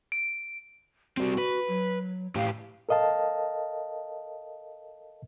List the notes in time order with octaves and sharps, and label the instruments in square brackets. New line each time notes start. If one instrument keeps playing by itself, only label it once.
[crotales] D7
[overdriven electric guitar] G3 C4 [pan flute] F#4
[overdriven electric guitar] B4
[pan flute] F#3
[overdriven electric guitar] A2 G4 [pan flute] F5
[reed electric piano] A4 A#4 D#5 F5 A5